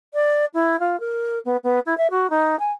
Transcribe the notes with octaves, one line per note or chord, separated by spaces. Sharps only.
D5
E4
F4
A#4
B3
B3
E4
E5
F#4
D#4
G#5